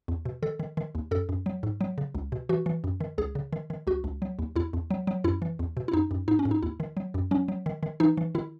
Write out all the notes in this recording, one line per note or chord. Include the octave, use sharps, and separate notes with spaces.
E2
B2
D#3 A4
D#3
D#3
D#2
F#2 A4
F#2
F#3
G#2
F#3
C#3
C#2
B2
E3 F#4
E3
F#2
D#3
C#2 G#4
C#3
D#3
D#3
C#2 F#4
C#2
F#3
D#2
E2 E4
E2
F#3
F#3
F#2 E4
E3
E2
B2
E4
F#2 D#4
F#2
G#2 D#4
C#4
G#2
D#4
D#2 E4
D#3
F#3
F#2
F#3 C#4
F#3
D#3
D#3
E3 D#4
E3
D#3 E4